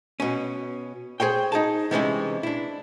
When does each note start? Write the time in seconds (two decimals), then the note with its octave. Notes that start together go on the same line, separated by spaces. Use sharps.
0.20 B2 C#4
1.20 G#4 C5 C#5 G5
1.52 D#4 G#4 A5
1.91 C3 E3 G#3 C#4
2.43 D4 E4